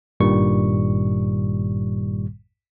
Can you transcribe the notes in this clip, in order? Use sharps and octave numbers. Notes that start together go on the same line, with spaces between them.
G#1 G2 A#2 D#3 G3 C#6